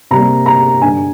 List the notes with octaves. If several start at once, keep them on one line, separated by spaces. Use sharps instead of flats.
C3 G3 A#3 A#5
A#5
G2 D3 G3 G#5